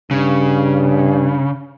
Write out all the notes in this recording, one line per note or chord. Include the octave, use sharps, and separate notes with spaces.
G2 C#3